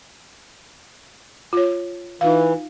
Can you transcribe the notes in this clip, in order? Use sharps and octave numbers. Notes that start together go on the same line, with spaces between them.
F4 C#5
E3 D#4 F4 F5